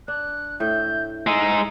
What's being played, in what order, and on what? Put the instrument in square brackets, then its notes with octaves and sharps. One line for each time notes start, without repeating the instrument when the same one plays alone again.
[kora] D4 [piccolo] F#6
[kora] A2 E5 [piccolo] G6
[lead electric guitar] G#3 D#4 [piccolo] E6